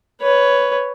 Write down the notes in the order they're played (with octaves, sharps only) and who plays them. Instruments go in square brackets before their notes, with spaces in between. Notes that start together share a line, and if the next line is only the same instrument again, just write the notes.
[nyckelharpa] B4 C#5